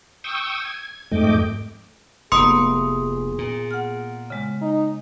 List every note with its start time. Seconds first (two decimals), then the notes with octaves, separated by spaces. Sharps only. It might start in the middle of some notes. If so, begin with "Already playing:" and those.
0.24 G5 C#6 D#6 E6
0.65 G#6
1.11 F2 G#2 A3 D#5 G5 D6
2.32 F1 A#3 B3 G#4 C6 D#6
3.38 A#2
3.71 F#5 F6
4.30 C#3 G#3
4.62 D#4